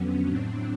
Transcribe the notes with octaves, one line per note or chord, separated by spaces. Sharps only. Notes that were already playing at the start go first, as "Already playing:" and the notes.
Already playing: F2 D3 F#3 B3 C#4
A2 F#3 C4 D4